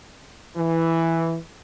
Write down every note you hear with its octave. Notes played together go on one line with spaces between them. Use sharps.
E3